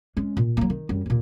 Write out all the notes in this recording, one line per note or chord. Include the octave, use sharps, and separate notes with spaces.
G#3 C#4
A#2
F#3 A#3
D#3
F#2 G3
D#2 A#2